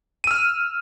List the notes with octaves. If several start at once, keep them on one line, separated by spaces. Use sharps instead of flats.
E6 F6 D#7